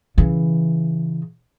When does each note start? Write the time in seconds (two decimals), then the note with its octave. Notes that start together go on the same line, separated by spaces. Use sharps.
0.18 C#3 E3